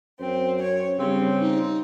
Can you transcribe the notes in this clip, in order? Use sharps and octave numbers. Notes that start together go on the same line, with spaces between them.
F#2 C4
C#5
G2 C#3 G3 C4
D#1 D#4